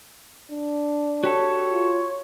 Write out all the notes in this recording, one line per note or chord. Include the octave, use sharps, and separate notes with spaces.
D4
F#4 G4 A4 C#5
F4